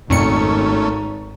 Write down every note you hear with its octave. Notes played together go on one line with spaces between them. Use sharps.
G#1 F2 A#2 A3 C#4 D#4 C#7